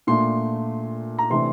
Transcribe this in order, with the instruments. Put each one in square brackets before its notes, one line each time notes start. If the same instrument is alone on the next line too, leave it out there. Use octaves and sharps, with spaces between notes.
[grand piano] A#2 A3 D4 C6
A#5
C3 E3 A3 D4 C6